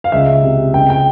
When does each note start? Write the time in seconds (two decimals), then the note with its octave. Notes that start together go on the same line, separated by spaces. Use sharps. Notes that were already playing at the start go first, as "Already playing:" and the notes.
0.04 F5
0.12 C#2 E5
0.43 C3
0.74 C#2 G5
0.90 G5